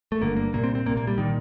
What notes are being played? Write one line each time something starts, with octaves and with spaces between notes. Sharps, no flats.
A3
G1 G2 D3 A#3
A#3
C2 A#2 A#3
C4
C4
C2 A#2 A#3
A#3
G3
A#2 D#3